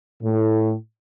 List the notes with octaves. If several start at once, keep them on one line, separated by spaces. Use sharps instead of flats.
A2